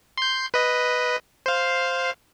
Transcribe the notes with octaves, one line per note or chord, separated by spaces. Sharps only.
C6 G6
B4 D#5
C5 F5